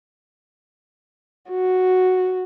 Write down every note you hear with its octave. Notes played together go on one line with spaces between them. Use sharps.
F#4